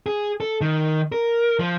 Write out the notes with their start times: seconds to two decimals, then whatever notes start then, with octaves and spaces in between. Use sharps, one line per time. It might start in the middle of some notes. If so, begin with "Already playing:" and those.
0.06 G#4
0.40 A4
0.61 D#3
1.12 A#4
1.59 F3